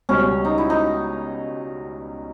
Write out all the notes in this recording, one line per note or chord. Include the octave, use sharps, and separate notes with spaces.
C#2 B2 G3 C#4
D#4
E4
D#4